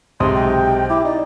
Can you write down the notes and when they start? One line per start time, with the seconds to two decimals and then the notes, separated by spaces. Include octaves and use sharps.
0.20 B1 C3 G#3 C6 D#6
0.35 G5
0.90 E4 D6
1.05 D#4 D5